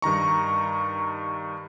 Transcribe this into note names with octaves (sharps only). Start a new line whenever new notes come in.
G2 D#3 A#5 C#6